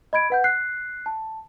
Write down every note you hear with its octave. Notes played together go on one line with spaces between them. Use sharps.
D#5 B5 G#6 D7
B4 F#5 G6
F#6 C7
A5